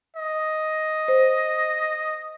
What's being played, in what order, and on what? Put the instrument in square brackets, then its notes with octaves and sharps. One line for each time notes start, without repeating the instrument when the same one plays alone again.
[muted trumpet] D#5
[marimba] C5